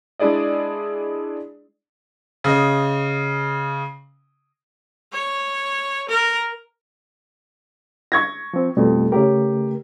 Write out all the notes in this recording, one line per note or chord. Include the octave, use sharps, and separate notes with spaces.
G#3 D4 E4 G#4 D5 D#5
C#3 D#5
C#5
A#4
C#6 G#6 A#6
F3 C4
F2 B2 G3 A3
C#3 A3 G4 A#4 C#5